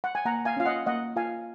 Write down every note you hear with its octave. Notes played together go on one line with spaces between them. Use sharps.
F#5
G#5
A#3 F#5 A#5
F5 G#5
C#4 F4 F5
D#5 F#5
A#3 D#5 F#5
F4 F5 G#5